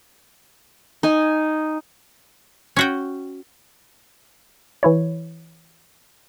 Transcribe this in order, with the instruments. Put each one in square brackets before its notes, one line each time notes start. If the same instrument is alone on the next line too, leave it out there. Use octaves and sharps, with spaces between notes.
[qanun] D#4 G#5
[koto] C#4 F#4 G5
[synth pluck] E3 E4 C#5